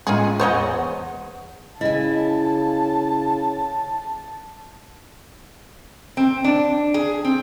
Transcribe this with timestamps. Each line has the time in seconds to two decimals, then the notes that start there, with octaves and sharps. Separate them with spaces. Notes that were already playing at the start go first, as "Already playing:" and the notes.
0.07 A2 G#3 C#4 F4 G#4
0.40 E2 C5 C#5 D#5 F#5
1.81 C#3 E4 D#5 G#5 A5
6.17 C4
6.44 D4
6.94 G#4
7.25 C4